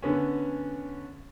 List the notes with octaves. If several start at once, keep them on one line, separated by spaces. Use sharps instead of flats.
D3 B3 C#4